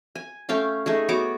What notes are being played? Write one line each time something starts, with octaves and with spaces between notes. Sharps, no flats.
G#5
A3 C#4 F5 G5
A3 D#4 G#4
B3 F#4 C#5 D6